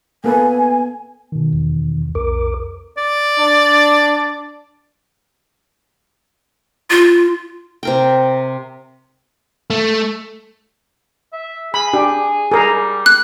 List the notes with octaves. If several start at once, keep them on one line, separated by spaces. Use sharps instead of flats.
A#3 B3 A4 B4 G#5
B2 D#3
E2
B1 F2 A#4 D6
D5
D4
F4
C3 A#4 G5
A3
E5
G#4 B5
D4 G4
G3 G#4 A#4
F#6